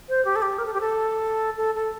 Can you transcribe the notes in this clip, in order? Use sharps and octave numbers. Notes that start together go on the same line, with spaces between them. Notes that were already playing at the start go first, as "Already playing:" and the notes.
C5
G4
A4
G4
A#4
A4
G4
A4
A4
A4